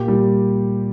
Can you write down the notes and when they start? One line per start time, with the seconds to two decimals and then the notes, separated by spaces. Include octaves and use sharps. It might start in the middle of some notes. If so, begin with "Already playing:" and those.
Already playing: A#2 G4
0.08 G3